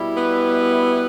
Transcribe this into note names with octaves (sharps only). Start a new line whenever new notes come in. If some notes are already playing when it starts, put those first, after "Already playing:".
Already playing: B2 G3 E4
B3 B4